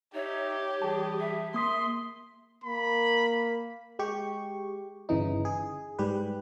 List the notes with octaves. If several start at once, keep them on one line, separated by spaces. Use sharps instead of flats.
D#4 G4 C#5 E5
E3 G3 G#4 A5
E5
A#3 C6 D#6 B6
A#3 B5
G#3 G4 C#6
G1 C#3 E3 D#4
G#4
G#2 G3 G4 B4